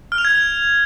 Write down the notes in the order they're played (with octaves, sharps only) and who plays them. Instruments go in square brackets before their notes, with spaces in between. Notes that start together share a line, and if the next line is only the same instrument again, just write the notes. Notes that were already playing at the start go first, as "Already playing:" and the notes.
[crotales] F6
F7
G#6